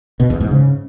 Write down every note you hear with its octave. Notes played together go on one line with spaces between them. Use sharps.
B2
E2
G#2
C#3